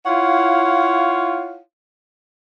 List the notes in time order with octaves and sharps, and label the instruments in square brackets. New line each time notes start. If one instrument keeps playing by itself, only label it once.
[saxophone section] E4 F4 C#5 F5 F#5